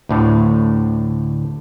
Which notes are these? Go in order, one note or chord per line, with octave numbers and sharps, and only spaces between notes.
D2 A2 D3